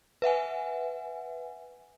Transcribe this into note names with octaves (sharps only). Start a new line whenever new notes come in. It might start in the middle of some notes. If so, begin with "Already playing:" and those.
B4 E5 F#5 G#5